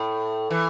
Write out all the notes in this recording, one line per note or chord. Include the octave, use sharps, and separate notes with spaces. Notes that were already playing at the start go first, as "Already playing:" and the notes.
Already playing: A2
E3